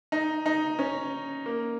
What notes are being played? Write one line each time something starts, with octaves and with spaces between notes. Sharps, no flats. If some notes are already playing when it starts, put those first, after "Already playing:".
D#4
D#4
C#4
A#3